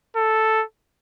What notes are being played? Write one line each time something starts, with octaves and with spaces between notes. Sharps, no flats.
A4